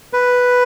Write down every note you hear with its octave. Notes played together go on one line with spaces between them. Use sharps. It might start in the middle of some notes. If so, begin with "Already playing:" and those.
B4